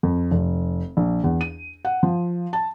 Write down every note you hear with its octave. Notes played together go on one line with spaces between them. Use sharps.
F2
F1
A#1
E2
D#7
F#5
F3
A5